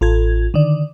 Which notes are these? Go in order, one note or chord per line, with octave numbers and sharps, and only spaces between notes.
A1 F4 A4 G#6
D3 D#3 D5